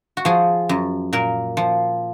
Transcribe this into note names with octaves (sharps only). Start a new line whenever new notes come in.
F#4
F3 G#4
F#2
A#2 A#4
F3